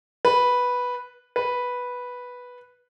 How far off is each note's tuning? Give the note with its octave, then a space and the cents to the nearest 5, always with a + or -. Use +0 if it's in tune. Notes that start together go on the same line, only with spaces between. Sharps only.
B4 -5
B4 -5